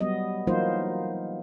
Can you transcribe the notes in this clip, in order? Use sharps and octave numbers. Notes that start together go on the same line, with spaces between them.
F#3 G3 B3 D#5
E3 F#3 A#3 D#4 F4 C5